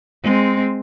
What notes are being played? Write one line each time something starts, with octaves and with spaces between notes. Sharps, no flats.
G#3 C4